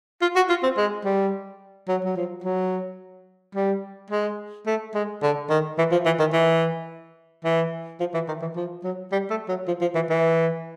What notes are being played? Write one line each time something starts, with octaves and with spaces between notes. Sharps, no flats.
F4
F#4
F4
C4
G#3
G3
F#3
F#3
F3
F#3
G3
G#3
A3
G#3
D3
D#3
E3
F3
E3
D#3
E3
E3
F3
E3
D#3
E3
F3
F#3
G3
A3
F#3
F3
F3
E3
E3